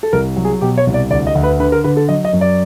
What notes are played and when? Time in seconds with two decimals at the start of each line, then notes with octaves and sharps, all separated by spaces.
0.03 A4
0.13 C2 A#4
0.37 F#3
0.45 G#4
0.61 B2 G4
0.78 C#5
0.87 C2
0.94 D5
1.10 D2 D5
1.27 D#5
1.35 D2
1.43 B4
1.60 D3 B4
1.72 A#4
1.84 D3 B4
1.97 A4
2.08 F#3 D#5
2.25 D#5
2.33 F#2
2.41 D5